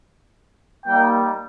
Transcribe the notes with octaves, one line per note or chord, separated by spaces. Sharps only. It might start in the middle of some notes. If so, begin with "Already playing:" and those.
G3 A#3 D#4 G5